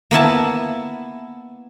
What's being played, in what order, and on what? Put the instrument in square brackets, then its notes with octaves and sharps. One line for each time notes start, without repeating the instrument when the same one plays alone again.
[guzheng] A#3 B3 E4 A5